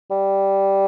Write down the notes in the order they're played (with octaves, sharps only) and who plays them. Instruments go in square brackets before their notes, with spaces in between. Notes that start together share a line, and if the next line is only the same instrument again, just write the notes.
[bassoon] G3